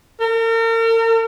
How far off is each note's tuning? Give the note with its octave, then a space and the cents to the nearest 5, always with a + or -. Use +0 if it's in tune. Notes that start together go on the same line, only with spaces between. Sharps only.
A#4 -40